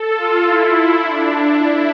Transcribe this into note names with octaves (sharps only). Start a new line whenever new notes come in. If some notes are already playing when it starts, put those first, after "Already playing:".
Already playing: A4
F4
E4
E4
D4
E4